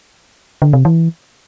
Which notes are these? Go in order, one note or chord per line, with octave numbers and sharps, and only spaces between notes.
D3
C3
E3